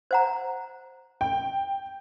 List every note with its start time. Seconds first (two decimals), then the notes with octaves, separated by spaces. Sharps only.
0.11 C5 F#5 A#5
1.21 G5